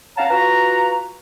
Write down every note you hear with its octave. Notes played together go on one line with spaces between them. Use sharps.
C#4 C#5 F5 F#5 A5 A#5
F4 F#4 B4 A#5